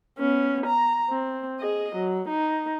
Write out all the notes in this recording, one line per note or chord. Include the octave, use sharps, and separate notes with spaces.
B3 C#4
A#5
C4
G#4 D#5
F#3
D#4